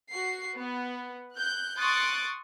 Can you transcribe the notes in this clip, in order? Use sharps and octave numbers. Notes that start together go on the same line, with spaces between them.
F#4 C7
B3
F#6 G6
C6 C#6 D#6 F#6 A6 D7